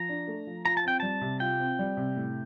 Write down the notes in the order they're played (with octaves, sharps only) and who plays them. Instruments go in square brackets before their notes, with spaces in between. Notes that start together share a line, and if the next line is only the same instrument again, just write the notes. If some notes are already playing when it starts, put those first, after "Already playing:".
Already playing: [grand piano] F3 [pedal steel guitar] A#5
[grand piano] D4
A3
F3
[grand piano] F4 [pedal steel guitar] A#5
[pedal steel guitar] A5
[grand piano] C4 [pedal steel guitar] G5
[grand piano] G3 [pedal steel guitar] A5
[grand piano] C3
[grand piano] F4 [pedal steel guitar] G5
[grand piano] C4
G3
C3
A2